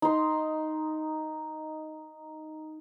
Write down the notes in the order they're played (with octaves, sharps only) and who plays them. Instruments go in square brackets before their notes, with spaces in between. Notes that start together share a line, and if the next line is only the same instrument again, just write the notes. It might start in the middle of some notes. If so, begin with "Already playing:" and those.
[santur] D#4 C6